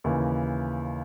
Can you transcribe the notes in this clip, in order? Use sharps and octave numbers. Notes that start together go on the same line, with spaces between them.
D#2 C#3 E3